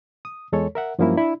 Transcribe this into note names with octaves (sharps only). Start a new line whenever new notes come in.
D#6
E2 G#3 A4 C#5
A#4 E5 F#5
G2 F3 F#3 A#3 C#4 E4
D4 E4